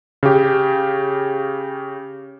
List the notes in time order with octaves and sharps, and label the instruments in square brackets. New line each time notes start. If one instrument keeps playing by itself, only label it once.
[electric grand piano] C#3 G4